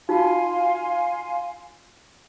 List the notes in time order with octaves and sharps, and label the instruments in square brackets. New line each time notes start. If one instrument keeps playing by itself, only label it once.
[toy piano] D#4 F4 F#4 [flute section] F5 G#5 C6